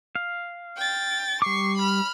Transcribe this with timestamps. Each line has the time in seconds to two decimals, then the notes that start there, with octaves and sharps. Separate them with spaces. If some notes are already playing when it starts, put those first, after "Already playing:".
0.15 F5
0.77 G5 A6
1.42 G3 C#6 D6 C7
1.77 B5 F6